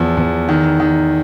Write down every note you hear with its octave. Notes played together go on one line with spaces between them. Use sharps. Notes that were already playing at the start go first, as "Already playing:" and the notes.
Already playing: E2 F3
E2
D#3
D#3